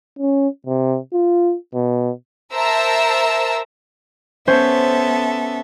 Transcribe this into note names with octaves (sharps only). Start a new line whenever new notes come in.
C#4
C3
F4
B2
A#4 C5 E5 A5 A#5 E6
B3 C#4 A4 C5 E5